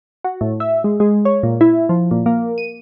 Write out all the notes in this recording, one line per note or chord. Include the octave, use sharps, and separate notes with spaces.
F#4
A2
E5
G#3
G#3
C#5
A#2
E4
F3
A#2
A#3
D#7